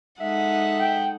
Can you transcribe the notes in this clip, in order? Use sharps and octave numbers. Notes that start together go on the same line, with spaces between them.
G#3 D#4 A4 E5 F#5
G5